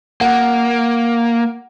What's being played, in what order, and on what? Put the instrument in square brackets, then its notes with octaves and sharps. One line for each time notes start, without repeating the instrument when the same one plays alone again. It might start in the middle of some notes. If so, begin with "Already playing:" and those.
[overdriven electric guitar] A#3 [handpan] F#5